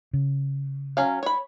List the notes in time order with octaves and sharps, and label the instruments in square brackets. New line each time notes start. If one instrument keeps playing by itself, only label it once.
[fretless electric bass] C#3
[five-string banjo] F#3 C#4 F5
C#5 B5